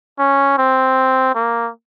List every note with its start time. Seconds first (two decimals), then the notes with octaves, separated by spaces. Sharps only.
0.19 C#4
0.58 C4
1.35 A#3